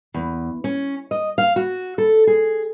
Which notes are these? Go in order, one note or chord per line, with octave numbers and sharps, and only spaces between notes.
E2
C#4
D#5
F5
F#4
A4
G#4